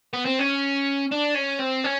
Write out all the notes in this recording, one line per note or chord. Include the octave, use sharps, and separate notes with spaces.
B3
C4
C#4
D4
C#4
C4
C#4